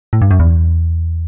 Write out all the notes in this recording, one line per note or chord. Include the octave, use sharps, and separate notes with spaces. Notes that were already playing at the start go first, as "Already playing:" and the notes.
A2
G2
F#2
E2